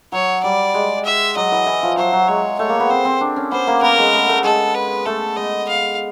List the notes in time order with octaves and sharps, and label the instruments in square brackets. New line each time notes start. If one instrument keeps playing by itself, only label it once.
[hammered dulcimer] F#3 [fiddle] C#5
[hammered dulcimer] G3 [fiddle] D5
[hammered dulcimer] G#3
[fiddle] E5
[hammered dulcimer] F#3 [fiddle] D#5
[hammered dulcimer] E3
E3
F3
[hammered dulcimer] F#3 [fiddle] C5
[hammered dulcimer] F#3
[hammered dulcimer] G#3 [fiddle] C#5
[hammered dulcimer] A3 [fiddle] C#5
[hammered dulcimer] A#3
B3
[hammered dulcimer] C4 [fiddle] C5
[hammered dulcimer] C4
D4
C#4
[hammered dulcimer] B3 [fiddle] C5
[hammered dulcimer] A#3
[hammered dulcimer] B3 [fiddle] A#4
[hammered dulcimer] G#3
A3
A3
[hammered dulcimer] G#3 [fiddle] A4
[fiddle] B4
[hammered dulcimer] A3 [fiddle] A4
[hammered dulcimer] G#3 [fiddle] D#5
[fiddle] F5